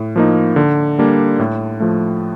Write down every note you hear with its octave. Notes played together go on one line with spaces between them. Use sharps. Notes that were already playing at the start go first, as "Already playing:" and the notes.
Already playing: A2
F3 A#3 D#4
D3
G3 A#3 D4
A2
F3 A3